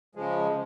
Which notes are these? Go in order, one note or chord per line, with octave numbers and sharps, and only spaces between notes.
C#3 F3 G#3